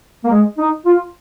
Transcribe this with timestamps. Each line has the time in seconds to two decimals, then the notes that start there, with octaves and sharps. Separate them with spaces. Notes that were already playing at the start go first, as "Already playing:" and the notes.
0.24 A#3
0.30 G#3
0.58 D#4
0.86 F4